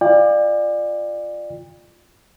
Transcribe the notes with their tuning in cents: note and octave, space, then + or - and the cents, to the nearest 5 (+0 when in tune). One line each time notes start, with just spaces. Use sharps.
F4 +0 D5 +25 G5 +40